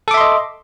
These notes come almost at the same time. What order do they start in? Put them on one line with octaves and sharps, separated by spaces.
A4 D6 E5 C6 D#5